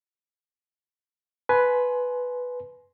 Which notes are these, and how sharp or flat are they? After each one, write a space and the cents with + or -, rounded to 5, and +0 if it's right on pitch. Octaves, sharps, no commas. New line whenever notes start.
B4 +0 G#5 +25 C6 +0